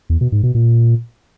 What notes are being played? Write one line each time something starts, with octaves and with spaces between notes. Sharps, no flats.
E2
B2
G#2
B2
A#2